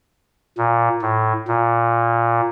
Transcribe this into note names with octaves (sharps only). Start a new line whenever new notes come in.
A#2
A2
A#2